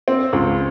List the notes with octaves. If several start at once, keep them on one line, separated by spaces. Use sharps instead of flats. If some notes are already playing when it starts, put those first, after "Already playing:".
C4
C#2